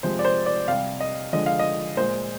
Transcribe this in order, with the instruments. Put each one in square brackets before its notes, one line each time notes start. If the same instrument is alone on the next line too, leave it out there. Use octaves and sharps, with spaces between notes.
[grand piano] C3 F3 G#3 C5
D5
C5
D5
C3 G3 F5
D#5
D3 F3 G#3 D#5
F5
D#5
A#2 G#3 C5